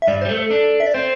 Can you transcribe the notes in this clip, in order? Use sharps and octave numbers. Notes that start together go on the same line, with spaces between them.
E5
G2 D5
G3 C5
A3
A4
D4
E5
D5
C4 C5